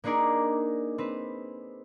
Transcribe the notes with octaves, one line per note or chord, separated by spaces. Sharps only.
A#3 D4 D#4 G#4 A#4
C4 B4